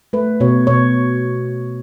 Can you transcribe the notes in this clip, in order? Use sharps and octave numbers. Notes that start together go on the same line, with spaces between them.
A3 B4
B2 C#5
B2 C#5